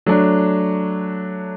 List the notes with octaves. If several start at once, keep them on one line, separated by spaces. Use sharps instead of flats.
F#3 A3 D4